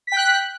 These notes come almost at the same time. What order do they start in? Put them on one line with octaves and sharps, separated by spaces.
B6 G5 F#6